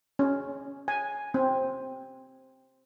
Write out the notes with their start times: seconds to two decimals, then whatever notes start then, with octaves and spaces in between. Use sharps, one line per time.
0.19 C#4
0.88 G#5
1.34 C4